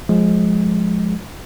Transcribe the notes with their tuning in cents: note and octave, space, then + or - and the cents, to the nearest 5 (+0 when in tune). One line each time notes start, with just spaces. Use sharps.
F3 +25 G#3 +10